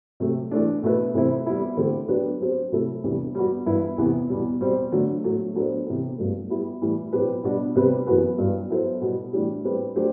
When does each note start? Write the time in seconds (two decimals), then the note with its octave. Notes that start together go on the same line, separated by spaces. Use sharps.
0.20 C3 F#3 A3
0.51 E3 A3 D4
0.83 B2 A3 E4 B4
1.14 C3 E3 A3 C4 E4
1.46 G3 B3 E4
1.77 D3 A3 C4 G4
2.08 F#3 B3 D4 G4 B4
2.41 F#3 C4 G4 C5
2.72 C3 F#3 A3 E4 A4
3.04 E2 C3 E3 G3 D4
3.35 G3 B3 F#4
3.66 G2 E3 B3 E4 B4
3.98 E2 C3 E3 B3
4.29 E2 B2 G3
4.60 B2 G3 C4 F#4
4.92 D3 F#3 A3 D4
5.24 A2 F#3 A3
5.55 F#3 B3 D4 A4 C5
5.86 C3 E3 B3
6.18 G2 F#3 A3
6.49 G3 B3 E4 G4
6.81 A2 E3 G3
7.12 B2 F#3 C4 G4 B4
7.43 B2 G3 B3 D4 F#4
7.75 C3 G3 C4 G4 B4
8.07 F#2 E3 B3 F#4 B4
8.38 G2 F#3 B3
8.70 F#3 B3 E4 A4 C5
9.01 B2 G3 B3
9.33 A2 E3 G3 D4 G4
9.64 G3 C4 G4 B4
9.95 F#3 A3 D4 G4 C5